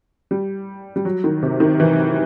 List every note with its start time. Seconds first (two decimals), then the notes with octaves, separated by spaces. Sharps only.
0.31 G3
0.96 G3
1.05 F#3
1.24 D#3
1.43 C3
1.60 D#3
1.80 E3